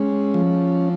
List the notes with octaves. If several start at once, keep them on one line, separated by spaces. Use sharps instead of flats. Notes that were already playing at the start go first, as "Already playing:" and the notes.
Already playing: G#3 C#4
F3